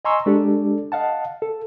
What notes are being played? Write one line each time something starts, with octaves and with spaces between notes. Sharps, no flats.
D#5 G#5 A#5 C6 C#6 E6
G#3 D4 G4 A4 D5
D#5 F5 F#5 A5
A4